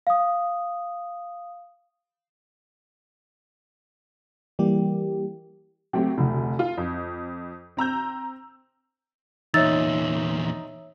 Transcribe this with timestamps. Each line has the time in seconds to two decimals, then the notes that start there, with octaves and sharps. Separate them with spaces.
0.07 F5 D#6
4.59 E3 G3 A#3 G4
5.93 F#3 A3 C4 G4
6.18 F1 D2
6.59 F4
6.78 F2
7.77 C4 A#5 E6 G6
9.54 E2 A#2 D#4 C#5 E5 E6 A6